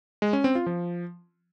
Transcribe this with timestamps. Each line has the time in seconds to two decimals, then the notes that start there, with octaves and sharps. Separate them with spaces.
0.22 G#3
0.33 C#4
0.44 C4
0.55 F4
0.66 F3